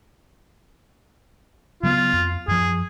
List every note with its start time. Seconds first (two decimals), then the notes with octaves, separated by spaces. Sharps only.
1.83 C#3 F#3 B3 F4
2.13 F2
2.48 F#2 F3 G#4